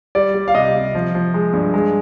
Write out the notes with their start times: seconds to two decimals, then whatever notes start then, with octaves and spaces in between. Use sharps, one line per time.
0.15 G3 D5
0.34 G3
0.48 F5
0.54 C3 D#5
0.75 C3
0.95 F3
1.15 F3
1.34 G#3
1.53 G2
1.74 G#3